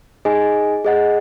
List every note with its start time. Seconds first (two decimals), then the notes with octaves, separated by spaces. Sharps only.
0.25 D#4 G#4 D#5 G#5
0.84 G#4 D#5 F#5